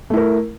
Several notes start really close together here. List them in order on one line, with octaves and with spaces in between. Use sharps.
A3 E4 A#4